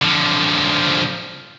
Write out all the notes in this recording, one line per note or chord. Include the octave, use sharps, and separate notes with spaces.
D3 F3